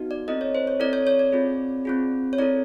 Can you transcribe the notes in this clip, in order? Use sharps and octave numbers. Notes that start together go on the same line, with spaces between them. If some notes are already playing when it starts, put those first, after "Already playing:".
Already playing: B3 D#4 F#4
D5
C4 E4 A4 D#5
C#5
C5
C#5
C4 E4 A4 D5
C#5
C#5
D5
C4 F4 G#4
C4 F4 G#4
C#5
C4 E4 A4 D5